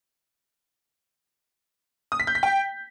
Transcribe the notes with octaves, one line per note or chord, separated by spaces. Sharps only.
D#6
B6
G6
B6
G5